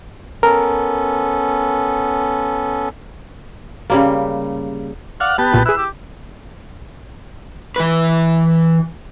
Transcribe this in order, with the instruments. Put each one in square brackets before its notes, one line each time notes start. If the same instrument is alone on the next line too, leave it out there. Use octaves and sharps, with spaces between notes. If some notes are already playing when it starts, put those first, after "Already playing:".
[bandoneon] B3 C#4 A4 [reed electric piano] A#4
[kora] C#3 G3 A#3
[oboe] D5 [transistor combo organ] F5 F#5 [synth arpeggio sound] C#6
[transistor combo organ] B3 G4 A5 [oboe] B4
[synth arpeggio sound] B1 A#2 F4
[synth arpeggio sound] E4 G#4 [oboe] B4 [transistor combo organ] E6
[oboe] G4
[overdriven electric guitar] E3 B4